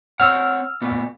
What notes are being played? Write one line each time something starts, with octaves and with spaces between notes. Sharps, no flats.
C4 C#5 F#5 E6 F6
A#2 A3 B3